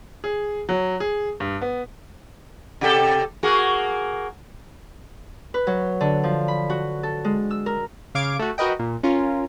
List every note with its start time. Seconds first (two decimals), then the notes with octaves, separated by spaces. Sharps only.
0.24 G#4
0.69 F#3
1.00 G#4
1.40 G2
1.61 B3
2.81 C3 G4 A4
3.43 A#3 F#4 G#4
5.54 B4
5.67 F#3
6.01 D3
6.24 F3
6.48 B5
6.70 F#4
7.03 A4
7.24 G#3
7.51 E6
7.66 A#4
8.15 C#3 F5 D6 G#6 D7
8.39 A3 F#4
8.58 F#4 A#4 B4 D#5 G5
8.79 A#2
9.03 C#4 F4 A#4